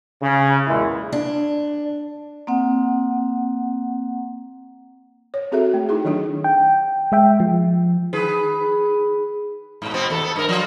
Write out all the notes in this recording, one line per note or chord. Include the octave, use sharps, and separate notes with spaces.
C#3
B1 E2 A#2 G#3 E4
D4
A#3 C4 F#5
C#5
C4 F#4 G#4 A4 E5
A3
D#4 E4 G#4
D#3 F#3 D4 F4
G5
G#3 E5 G5
F3
D#3 G#4 B4
G#2 B2
B2 B3 C4
D#2 A4
B3 A4
G2 A#4
F3 F4